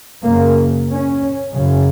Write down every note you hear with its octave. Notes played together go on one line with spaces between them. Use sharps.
F#2 C#3 A#3
C#4
F#2 C#3